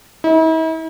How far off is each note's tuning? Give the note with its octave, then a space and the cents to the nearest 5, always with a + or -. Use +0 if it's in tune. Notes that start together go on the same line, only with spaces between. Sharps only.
E4 -45